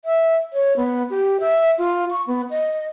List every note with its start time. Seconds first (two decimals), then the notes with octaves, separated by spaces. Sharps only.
0.05 E5
0.53 C#5
0.77 B3
1.10 G4
1.40 E5
1.78 F4
2.10 C#6
2.27 B3
2.51 D#5